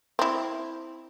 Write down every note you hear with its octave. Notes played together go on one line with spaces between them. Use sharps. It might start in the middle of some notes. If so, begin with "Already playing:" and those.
C4 E4